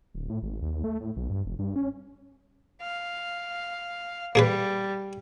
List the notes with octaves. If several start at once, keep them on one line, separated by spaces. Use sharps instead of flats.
D1
A2
G#1
D#2
A3
A2
B1
G2
F1
G2
C#4
F5
G3 A#3 G#4 B4